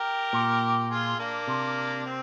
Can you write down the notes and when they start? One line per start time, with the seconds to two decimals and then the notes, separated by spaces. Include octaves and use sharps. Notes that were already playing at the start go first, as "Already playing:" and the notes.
Already playing: G4 A#4
0.33 A#2
0.91 F4 G#4
1.19 A#3 D4
1.47 C3
2.06 C4